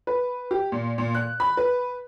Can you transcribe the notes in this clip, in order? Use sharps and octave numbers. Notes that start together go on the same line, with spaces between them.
B4
G4
A#2
A#2
F#6
B5
B4